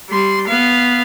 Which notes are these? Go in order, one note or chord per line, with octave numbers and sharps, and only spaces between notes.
G3 C6
B3 F5